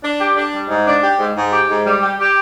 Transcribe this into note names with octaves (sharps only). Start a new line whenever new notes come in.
D4
G4
D4
G3
G#2
D4
G4
G#2
G#2
G4
G#2
G3
G4
G4